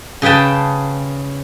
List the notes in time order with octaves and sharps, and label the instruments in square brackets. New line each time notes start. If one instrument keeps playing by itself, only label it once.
[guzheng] C#3 G#4 B4 G5 A5